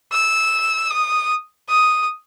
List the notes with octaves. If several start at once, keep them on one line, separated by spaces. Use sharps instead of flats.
E6
D#6
D#6